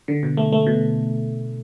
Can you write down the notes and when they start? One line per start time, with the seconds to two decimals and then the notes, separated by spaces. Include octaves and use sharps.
0.08 D3
0.23 B2
0.37 A3
0.52 A3
0.67 B2